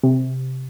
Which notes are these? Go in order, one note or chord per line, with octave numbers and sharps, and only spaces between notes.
C3